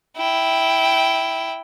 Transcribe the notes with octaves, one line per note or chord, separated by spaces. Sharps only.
E4 G5